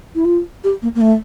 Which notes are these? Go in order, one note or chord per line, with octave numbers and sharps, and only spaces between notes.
E4
F4
G4
A#3
A#3
A3